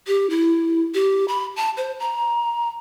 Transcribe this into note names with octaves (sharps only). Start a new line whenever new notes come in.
G4
E4
G4
B5
A5
C5
A#5